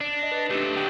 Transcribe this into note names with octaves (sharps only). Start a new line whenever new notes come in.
D4 D5
D#5 A#6
B4
A3 C4 D4 G4
D3 F#3 G5 G6